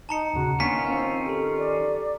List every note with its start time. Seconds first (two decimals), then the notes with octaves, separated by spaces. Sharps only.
0.09 D#4 A5 A#5 C#7
0.34 D#2 A#2 C#3 F#4
0.60 D#3 A#3 B3 C#4 D4 F4 C#6 B6
0.86 C4 F5
1.26 G4 A4
1.58 D5